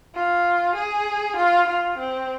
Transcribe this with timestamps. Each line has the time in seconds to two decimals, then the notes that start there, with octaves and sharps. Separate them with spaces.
0.15 F4
0.75 G#4
1.36 F4
1.67 F4
1.98 C4